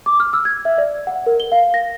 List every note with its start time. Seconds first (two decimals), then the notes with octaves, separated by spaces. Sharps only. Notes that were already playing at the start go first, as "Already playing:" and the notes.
0.06 D6
0.20 F6
0.33 E6
0.45 G#6
0.65 E5
0.78 D5
1.07 F#5
1.26 A#4
1.40 G7
1.52 F5
1.74 A#6